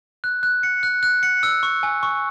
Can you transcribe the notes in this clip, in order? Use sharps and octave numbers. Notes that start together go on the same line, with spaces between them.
F#6
F#6
C#7
F#6
F#6
C#7
E6
C#6
G#5
C#6